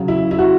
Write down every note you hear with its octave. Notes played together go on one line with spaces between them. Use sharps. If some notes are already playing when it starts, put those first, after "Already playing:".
Already playing: C#3 F#3
E4
E4
F#4